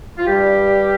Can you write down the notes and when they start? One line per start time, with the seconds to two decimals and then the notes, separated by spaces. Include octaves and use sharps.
0.18 F4
0.26 G2 G3 G4